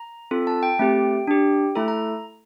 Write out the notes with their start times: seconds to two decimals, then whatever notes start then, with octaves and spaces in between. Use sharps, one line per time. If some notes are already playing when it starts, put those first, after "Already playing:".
Already playing: A#5
0.31 C4 F4 A4
0.47 A5
0.63 G5
0.79 A3 C4 G4
1.28 D4 G4
1.75 A3 E4 A4 A#5
1.88 A#5